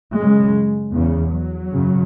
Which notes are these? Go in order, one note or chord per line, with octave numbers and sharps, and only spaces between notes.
F#2 C#3 G#3
E2 C#3
F#3
F#2 C#3